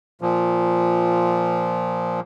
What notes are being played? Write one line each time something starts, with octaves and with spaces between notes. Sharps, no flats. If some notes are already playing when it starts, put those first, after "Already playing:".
A#2 F3